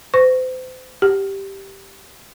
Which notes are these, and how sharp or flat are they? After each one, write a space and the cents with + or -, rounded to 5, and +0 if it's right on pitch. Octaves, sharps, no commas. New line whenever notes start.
C5 -35 C#6 +0
G4 -5 F#5 +35